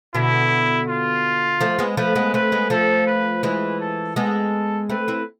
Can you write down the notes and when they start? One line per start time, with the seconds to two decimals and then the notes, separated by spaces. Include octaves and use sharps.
0.14 B2 D3 E4
0.88 F4
1.61 F3 A3
1.79 G#3 B3
1.97 F3 A3 B4
2.15 G#3 B3
2.34 A3 C4 B4
2.52 G#3 B3
2.70 F3 A3 A4
3.07 B4
3.43 E3 G#3 B4
3.80 A4
4.16 G#3 B3 A4
4.89 A3 C4 B4
5.08 C4 E4